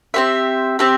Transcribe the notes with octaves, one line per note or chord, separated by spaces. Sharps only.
C4 G4 C5 E5
C4 G4 C5 E5